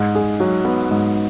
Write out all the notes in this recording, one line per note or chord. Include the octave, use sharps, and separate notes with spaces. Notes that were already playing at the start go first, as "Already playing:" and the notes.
Already playing: G#2
G#4
F#3
B3
G#2